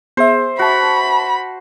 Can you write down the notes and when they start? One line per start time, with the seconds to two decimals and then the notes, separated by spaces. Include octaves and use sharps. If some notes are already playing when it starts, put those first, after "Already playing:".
0.17 B3 G#4 C5 E5
0.59 F#4 E5 A5 B5